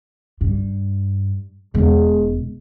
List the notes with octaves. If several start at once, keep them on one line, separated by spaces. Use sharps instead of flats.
G2
E1 G#3